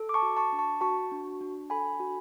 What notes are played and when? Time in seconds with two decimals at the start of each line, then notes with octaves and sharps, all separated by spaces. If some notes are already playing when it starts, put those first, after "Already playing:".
Already playing: A4
0.09 D6
0.14 A5 C#6
0.22 F#4
0.37 A5 C#6
0.52 D4
0.59 A5 C#6
0.81 F#4 A5 C#6
1.11 D4
1.41 D4
1.70 A4 G#5 B5
2.00 F#4